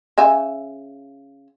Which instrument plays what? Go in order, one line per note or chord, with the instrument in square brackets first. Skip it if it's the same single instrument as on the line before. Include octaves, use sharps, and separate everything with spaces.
[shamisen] C#3 E5 G#5